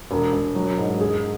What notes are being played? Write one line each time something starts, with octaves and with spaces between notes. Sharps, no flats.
E1
E1
F#3
G#2
G#4